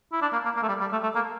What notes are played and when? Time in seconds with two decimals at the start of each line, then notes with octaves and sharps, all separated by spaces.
0.12 E4
0.22 D4
0.33 A#3
0.45 A#3
0.57 A#3
0.62 A3
0.68 G3
0.80 G3
0.92 A3
1.03 A3
1.15 A#3